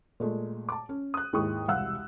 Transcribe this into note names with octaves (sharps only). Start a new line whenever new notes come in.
A#2 G#3 A3
A5 D6
C#4
D#6 F#6
D#2 G#2 E4 G#4 C#6 D#6
E1 C2 F5 F#5 E6 F#6